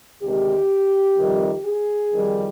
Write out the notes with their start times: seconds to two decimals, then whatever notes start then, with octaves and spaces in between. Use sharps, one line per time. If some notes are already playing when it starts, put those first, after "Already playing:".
0.21 D2 C3 D#3 G#3 G4
1.16 F2 C3 D#3 G3
1.64 G#4
2.12 F2 D#3 G3